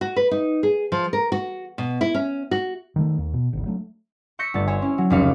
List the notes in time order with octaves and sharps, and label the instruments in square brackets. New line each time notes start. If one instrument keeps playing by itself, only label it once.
[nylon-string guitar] F#4
B4
D#4
G#4
F3
A#4
F#4
B2
E4
C#4
F#4
[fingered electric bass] D#3 E3 A3
D#2
B2
G#1 D2
F#3 A3 D4
[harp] C#6 E6 G6 A#6 B6 C#7
G1 A3 A6
C5 C#5 E5 G#5 C#6
C#4 E4
F#3
F1 C#2 F5 C#7